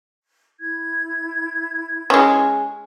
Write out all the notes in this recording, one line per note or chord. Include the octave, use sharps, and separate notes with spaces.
E4 G#6
G#3 C#4